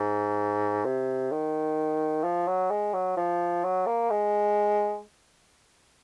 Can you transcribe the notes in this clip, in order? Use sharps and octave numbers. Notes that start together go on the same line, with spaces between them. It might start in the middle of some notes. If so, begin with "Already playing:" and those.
Already playing: G#2
C3
D#3
F3
F#3
G#3
F#3
F3
F#3
A#3
G#3